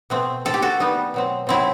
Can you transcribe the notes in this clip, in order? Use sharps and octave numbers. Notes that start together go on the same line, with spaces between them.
B2 A3 C4
D#3 A3 C4 A4
G4
F#4 A4
D#3 G3 B3 D#4
B2 F#3 C4
C3 D#3 F#3 C4 E4